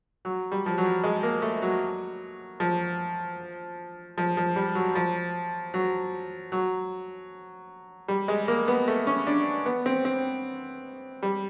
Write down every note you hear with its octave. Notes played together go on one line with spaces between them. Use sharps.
F#3
G3
F3
F#3
G#3
A#3
A3
F#3
F3
F3
F3
G3
F#3
F3
F#3
F#3
G3
G#3
A#3
B3
A3
C#4
D4
B3
C4
C4
G3